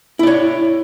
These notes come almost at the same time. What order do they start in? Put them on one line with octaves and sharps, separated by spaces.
E4 D5 C#5